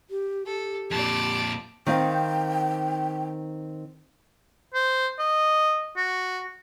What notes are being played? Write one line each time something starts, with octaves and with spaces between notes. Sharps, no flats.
G4
G4 A4
F2 A#2 D5 A5
D#3 C4 F5 G5
C5
D#5
F#4